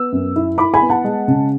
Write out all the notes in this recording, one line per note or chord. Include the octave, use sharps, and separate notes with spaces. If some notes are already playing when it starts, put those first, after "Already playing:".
Already playing: B3 E6
F#2
E4
E4 B5 D6
G#5 B5
B3
F#5 A5
G#3
C#3